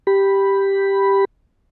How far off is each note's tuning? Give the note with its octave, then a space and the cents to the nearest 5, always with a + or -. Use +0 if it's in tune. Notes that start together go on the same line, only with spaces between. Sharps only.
G4 +0 B5 +0